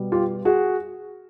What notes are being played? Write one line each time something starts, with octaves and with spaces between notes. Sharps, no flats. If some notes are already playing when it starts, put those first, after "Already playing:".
Already playing: B2 G3 B3
F4 G4
F#4 G#4